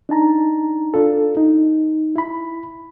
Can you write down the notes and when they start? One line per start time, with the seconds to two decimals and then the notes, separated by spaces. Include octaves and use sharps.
0.09 D4 D#4 A5 A#5
0.94 D4 F4 A4
1.37 D#4
2.16 E4 B5